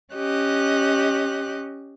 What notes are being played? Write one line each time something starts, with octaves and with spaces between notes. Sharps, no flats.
C#4 G4 D#5 F#6